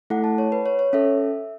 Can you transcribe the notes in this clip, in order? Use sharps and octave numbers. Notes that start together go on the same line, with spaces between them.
A3 E4 A4 F#5
A5
C#5
B4
C#5
C#5
C#4 A4 E5